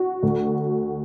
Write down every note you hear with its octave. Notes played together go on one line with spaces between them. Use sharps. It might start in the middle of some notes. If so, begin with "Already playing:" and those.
Already playing: F#4
D2